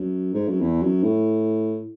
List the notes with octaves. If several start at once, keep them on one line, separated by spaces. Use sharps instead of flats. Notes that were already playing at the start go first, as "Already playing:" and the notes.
Already playing: F#2
G#2
F#2
E2
F#2
A2